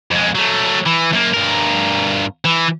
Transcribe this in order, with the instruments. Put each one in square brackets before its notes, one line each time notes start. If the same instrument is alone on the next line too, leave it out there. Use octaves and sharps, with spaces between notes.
[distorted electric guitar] F2 G#3
F#3 A3
E3
F#2 A#3
G2 A#4
E3